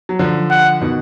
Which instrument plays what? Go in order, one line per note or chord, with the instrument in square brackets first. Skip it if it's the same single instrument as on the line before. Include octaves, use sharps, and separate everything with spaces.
[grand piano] F#3
D3 F3
[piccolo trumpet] F#5
[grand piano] B2 D#3